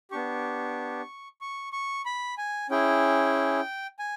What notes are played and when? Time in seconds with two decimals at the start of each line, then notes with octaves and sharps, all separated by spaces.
0.11 B3 D4 G4 C#6
1.41 C#6
1.73 C#6
2.05 B5
2.38 G#5
2.70 C#4 E4 G#4 G5
3.99 G#5